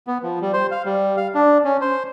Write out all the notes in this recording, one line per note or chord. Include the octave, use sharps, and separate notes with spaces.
B3
F3
G3
C5
F5
G3
F5
D4
C#4
C5